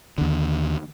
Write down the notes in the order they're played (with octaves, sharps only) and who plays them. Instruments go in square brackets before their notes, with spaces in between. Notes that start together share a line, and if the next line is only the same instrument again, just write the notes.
[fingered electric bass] D#2 D3